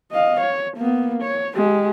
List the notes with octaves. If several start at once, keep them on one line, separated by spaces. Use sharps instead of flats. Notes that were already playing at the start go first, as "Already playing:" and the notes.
D#5 F5
C#5
A#3 B3
C#5
G#3 G4